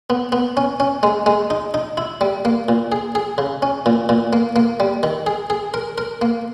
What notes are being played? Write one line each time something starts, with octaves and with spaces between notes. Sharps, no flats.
B3
B3
C#4
C#4
G#3
G#3
D#4
D#4
E4
G3
A#3
A#2
G#4
G#4
C#3
C#4
A#2
A#2
A#3
A#3
G3
D#3
G#4
G#4
A#4
A#4
A#3